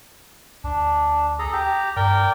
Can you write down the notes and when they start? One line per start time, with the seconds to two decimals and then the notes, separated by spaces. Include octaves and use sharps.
0.64 D2 D4
1.39 G#4 A4 A#5
1.53 G4 A#5
1.97 G2 A#4 D5 G5